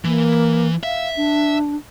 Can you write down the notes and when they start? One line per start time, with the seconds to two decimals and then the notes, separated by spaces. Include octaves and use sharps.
0.05 E3 A#3
0.83 E5 F5
1.16 D4